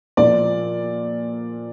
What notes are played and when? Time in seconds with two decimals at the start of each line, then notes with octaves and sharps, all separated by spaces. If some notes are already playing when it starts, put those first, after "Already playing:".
0.17 A#2 F3 D5